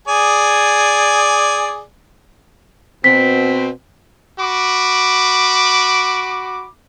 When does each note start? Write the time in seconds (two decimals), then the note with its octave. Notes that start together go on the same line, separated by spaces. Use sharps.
0.08 G#4 D5 G#5
3.04 B2 C4 B6
4.40 F#4 B5 D6